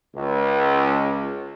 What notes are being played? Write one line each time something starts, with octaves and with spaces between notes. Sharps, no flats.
C#2